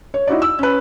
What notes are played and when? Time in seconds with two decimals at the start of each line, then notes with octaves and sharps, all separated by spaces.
0.14 C#5
0.27 D#4 E4 F#4 D5
0.42 E6
0.59 C#4 B4